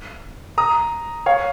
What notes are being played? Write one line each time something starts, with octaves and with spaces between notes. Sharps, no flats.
A#5 D#6
C#5 F5